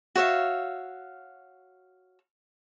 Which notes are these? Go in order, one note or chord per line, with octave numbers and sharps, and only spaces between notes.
F#4 C#5 E5 F5